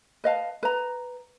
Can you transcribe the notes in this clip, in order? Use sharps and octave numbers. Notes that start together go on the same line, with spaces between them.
B4 D#5 F5 A5
B4 A#5